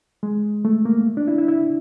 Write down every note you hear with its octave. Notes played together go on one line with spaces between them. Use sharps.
G#3
A3
A#3
D4
E4
E4
E4